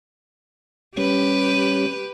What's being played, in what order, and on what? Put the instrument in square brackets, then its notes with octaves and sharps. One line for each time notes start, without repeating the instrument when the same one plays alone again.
[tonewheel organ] G3 C#4 [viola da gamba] G4 B4